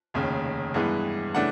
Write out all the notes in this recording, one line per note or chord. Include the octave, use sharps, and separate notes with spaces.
F1 D#2 C#3
G2 E3 G#3 B3
C#3 E3 A3 D4 F#5